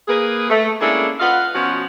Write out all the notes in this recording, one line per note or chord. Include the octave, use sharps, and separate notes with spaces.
A#3 G#4 B4
A3
G#3 A#3 C#4 D4 E4 A4
F4 B4 D#5 F5 F#5
B2 F3 C#4 F#4